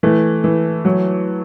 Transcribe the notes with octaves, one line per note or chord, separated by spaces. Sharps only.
E3 A3
E3
F#3